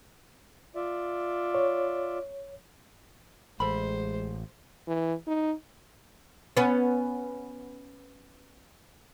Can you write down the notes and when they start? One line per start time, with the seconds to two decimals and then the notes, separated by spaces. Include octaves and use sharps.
0.75 F4 D5 E5
1.55 C#5
3.60 A1 G#3 A4 C5 B5
4.88 E3
5.27 D#4
6.57 B3 C#4